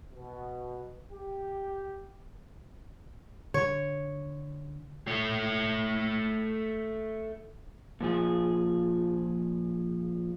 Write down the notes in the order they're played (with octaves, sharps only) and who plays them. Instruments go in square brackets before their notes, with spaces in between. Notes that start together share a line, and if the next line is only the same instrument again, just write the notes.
[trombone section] B2
G4
[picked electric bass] D3 [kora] C#5
[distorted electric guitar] A3 C#5
[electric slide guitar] A#2 F3 G#4